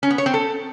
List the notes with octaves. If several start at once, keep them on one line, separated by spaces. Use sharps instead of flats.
C#4
B3
C#5
C4
A4